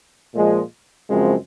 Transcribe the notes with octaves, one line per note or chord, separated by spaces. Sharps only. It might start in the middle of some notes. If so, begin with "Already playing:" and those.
A#2 F3 G#3
F#2 C#3 F3 G#3 C4